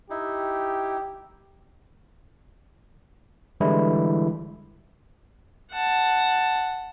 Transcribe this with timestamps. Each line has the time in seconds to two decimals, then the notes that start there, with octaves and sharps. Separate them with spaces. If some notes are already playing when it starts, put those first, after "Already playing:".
0.10 D#4 E4 G4
3.60 D3 E3 G3 G#3 E4
5.72 F#5 A5